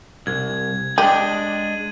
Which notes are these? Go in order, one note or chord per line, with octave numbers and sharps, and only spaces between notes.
C2 G#6
G#3 D4 G4 D#7 F#7